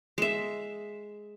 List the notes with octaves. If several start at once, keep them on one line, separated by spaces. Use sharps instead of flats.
G#3 E5